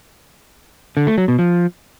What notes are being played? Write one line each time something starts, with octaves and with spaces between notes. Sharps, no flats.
D3
A3
F#3
B2
F3